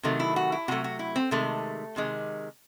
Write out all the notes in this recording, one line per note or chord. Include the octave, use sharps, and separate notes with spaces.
C3 D#3 F#3 A3
E4
F#4
E4
C3 D#3 F#3 A3 F#4
F#4
E4
C4
C3 D#3 G#3 A3
C3 D#3 G#3